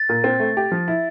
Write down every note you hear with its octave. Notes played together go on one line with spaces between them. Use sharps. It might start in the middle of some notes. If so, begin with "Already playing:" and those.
Already playing: A6
A#2
C4
A3
G4
F3
E4